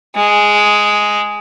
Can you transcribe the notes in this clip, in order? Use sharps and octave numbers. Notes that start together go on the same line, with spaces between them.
G#3